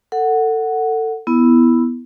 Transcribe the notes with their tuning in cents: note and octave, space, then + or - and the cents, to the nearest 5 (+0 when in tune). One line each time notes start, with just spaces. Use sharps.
A4 +25 F#5 +0
B3 +0 E4 +0